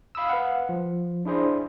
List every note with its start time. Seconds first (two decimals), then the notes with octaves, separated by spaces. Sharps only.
0.15 F5 B5 D#6 E6
0.29 B4 F5 F#5
0.69 F3
1.25 D4 E4 G#4 C5 D5